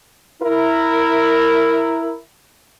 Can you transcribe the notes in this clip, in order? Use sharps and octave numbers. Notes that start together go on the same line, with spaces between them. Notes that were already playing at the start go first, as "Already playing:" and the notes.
E4 A#4